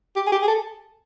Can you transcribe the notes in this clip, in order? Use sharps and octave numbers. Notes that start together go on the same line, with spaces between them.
G4
G#4
G4
G#4
A4